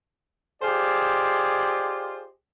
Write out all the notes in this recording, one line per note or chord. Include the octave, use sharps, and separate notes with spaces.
F4 G4 G#4 C5 D5 D#5